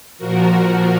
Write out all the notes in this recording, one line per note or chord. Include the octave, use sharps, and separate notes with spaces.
A#2 F3 F#4 A#4